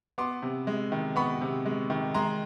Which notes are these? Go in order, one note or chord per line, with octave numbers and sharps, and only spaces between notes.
B3 C6 D6
C3
G#3
D#3
B3 B5 C#6
C3
G#3
D#3
G#3 A#5 C6